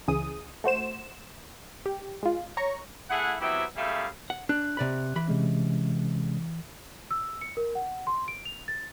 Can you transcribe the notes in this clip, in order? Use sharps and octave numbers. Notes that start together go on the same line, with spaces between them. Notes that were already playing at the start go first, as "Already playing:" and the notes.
C#2 C#3 E3 G#4 D#6
A3 F#4 C5 E7
G4
G#3 F4
C#5 A#5 C#6
A3 E4 G#4 F#5
F#3 B3 C4 E4 G4 E5
F#2 G3 A3 G#4 E5 F5
F#5
D4 F#6
C3 D5 B5
E3 B5
C3 G#3 C#4
E6
C#7
A#4
F#5
C6
D7
F7
A6